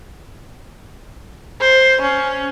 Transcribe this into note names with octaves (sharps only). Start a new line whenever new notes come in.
C5
C#4